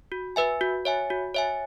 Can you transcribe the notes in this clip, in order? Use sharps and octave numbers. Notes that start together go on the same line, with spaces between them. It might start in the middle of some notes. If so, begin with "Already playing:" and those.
F#4
B4 E5 G#5
F#4
C#5 E5 G#5
F#4
C#5 E5 G#5